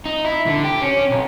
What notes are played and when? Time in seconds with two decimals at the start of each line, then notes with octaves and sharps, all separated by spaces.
0.05 D#4
0.25 E4
0.47 D3
0.64 G4
0.82 C#4
1.10 B1